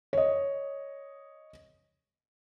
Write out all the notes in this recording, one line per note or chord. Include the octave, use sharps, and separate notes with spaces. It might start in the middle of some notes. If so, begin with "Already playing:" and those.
C#5 D#5